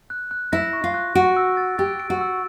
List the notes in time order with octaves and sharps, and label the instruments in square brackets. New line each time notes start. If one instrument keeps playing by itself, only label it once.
[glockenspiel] F#6
F#6
[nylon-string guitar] E4 [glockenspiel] A#6
[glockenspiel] C#6
[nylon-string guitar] F4
[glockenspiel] F#6
[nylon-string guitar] F#4 [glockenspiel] D7
[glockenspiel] E6
A6
[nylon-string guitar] G4 [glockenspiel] A6
[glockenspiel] D7
[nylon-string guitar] F#4
[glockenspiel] E6